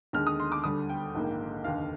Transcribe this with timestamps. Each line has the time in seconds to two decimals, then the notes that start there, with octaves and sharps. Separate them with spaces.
0.13 D#2 D3 G#3 F6
0.27 D#6
0.40 C6
0.52 D6
0.64 D2 D3 G3 D#6
0.89 G5
1.15 A#1 G#2 D#3 A#3
1.64 F1 D#2 D3 F5